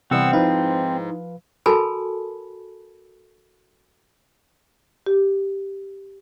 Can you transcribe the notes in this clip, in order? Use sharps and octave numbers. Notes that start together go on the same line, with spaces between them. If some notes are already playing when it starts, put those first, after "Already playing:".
C3 E3 G3 B3 C4 F#5 E6
G#2 F3 D#4 E4 B4 F5
F#4 A4 A#4 G#5 A5 B5
G4